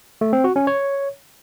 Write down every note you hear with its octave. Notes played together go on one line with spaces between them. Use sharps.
A3
C4
F#4
C#4
C#5